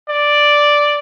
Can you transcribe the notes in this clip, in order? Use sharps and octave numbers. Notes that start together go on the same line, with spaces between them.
D5